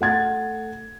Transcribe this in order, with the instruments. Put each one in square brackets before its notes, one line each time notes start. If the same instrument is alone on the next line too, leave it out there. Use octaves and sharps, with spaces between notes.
[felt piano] A3 F#5 G#6 A6